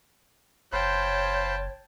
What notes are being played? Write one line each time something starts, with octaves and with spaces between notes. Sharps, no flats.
F#1 C5 C#5 F5 G5 A5 B5